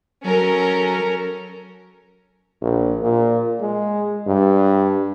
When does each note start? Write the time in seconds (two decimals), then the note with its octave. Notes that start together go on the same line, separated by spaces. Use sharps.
0.24 F#3 C#4 A4 A#4
2.61 A#1
3.03 A#2
3.60 G#3
4.27 G2